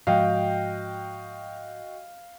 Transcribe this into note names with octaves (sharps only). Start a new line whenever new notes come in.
G#2 F3 G#3 F#4 D#5 F5 G5